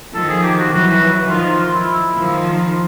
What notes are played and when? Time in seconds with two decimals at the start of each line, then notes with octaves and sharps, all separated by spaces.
0.14 D#3 F3 A4
0.29 G#4
0.43 G4
0.59 F#4
0.72 E3 F#3 F#4
1.30 D#3 F3 F4
1.60 F4
1.74 E4
1.88 E4
2.17 D#3 F3
2.47 F4